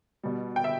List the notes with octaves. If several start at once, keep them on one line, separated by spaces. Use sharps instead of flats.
B2 G3
G5
E5